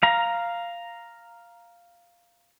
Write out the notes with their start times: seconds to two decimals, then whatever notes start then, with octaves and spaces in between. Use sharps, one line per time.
0.03 F5 A#5